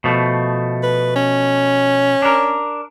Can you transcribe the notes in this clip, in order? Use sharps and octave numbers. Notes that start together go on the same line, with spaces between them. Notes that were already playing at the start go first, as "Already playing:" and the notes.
B2 F3 A3
B4
C#4
D4 A#4